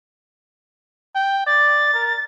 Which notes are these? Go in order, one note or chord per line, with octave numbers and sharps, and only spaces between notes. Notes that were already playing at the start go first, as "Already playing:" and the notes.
G5
D5 A6
A#4